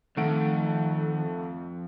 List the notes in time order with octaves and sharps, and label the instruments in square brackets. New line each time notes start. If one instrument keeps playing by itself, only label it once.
[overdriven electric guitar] F2 [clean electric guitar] D#3 [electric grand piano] A3 F#5 D7